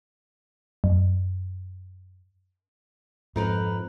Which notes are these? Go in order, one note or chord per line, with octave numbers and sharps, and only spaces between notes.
F#2
F2 G#2 D#4 A#4 B4